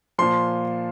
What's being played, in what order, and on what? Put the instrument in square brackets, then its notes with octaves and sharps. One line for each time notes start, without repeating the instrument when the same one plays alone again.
[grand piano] A#2 F3 C6